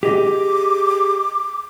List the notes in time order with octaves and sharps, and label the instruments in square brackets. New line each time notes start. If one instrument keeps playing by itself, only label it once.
[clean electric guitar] G4 G#4 D#5 [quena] D6